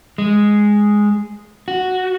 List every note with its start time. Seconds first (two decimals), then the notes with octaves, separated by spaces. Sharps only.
0.18 G#3
1.68 F#4